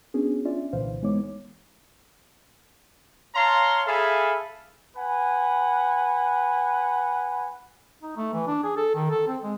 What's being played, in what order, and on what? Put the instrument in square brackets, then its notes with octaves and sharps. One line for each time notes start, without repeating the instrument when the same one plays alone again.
[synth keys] B3 C#4 D4 F#4 G#4
C#4 D4 F4 D5 E5
C2 A#2 D3 E3 C5 F5
E3 G#3 B3 D#4 C#5 D6
[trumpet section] C#5 F5 A5 A#5 C6
G#4 A4 E5 F5 G#5 B5
[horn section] B4 F#5 G#5
[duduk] D#4
A3
E3
D4
G#4
A4
D#3
A4
C4
G#3